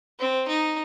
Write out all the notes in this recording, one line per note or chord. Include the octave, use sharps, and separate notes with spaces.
C4
D#4